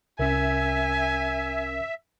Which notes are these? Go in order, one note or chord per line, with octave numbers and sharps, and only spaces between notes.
C2 C#4 A#4 E5 G#5